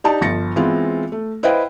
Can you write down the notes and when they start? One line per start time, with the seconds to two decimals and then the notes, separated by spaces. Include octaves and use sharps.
0.04 D4 D#4 G4 A5
0.21 G1 F3 A6 A#6 C#7
0.56 E3 G#3 B3 C4 F4
1.12 A3
1.43 E4 B4 C5 D#5 F5 G5